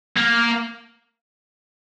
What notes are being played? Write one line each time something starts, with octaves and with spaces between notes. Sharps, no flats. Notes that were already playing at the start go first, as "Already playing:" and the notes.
A#3